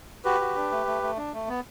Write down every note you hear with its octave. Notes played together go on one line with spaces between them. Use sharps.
F#4 G4 B4
F#4
D4
A3
A3
A3
D4
A3
B3